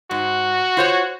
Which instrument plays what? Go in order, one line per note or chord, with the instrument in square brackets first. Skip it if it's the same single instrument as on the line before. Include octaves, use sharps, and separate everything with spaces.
[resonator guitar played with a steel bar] G#2 [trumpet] F#4
[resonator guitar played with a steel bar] F4 C5 C#5